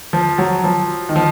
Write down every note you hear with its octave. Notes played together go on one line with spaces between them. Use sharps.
F3
F#3
F3
D#3
F3